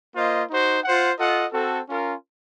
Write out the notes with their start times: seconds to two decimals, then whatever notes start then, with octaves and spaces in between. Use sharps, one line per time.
0.15 A#3 F4 C5 D#5
0.50 D#4 F#4 C5
0.84 F4 C5 F#5
1.18 F4 A4 D#5 F#5
1.52 C4 F#4 A4
1.86 C#4 F4 A#4